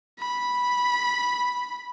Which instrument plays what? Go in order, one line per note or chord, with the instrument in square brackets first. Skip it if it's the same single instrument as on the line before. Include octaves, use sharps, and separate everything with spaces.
[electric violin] B5